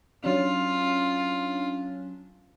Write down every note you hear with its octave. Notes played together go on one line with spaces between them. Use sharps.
F#3 C#4 D4 F4